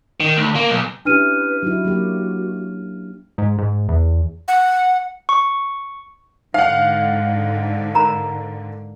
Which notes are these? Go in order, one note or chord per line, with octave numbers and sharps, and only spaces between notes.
D#3
D2
A#3
B1
C#4 D4 E4 G4 B4 F6 D#7
F#3 D#4 E4 F#4
F#3 A#3 G4
G#2
G#2
E2
F#5
C#6
G#2 D3 D#4 F5 F#5
A#4 A#5 B5